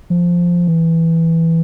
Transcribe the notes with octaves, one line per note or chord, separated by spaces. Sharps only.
F3
E3